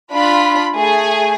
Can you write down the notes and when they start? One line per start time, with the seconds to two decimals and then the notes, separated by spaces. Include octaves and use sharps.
0.11 D4 F4 B5
0.77 A3 G#4 G#5